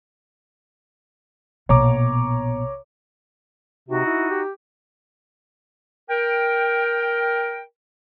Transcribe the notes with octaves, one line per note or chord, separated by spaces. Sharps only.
A#1 B2 C#5 A#5 D6
C3 D#4 F#4
E4
G4
A#4 G5